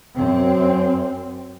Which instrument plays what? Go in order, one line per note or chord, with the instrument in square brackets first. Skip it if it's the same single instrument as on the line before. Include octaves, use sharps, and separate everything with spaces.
[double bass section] F#2 C4